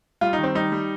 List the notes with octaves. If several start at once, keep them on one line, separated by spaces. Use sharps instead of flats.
G3 F4
D#4
D#3
C4
G3 D#4
G3